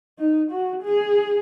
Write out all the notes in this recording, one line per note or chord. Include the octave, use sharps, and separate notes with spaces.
D#4
F#4
G#4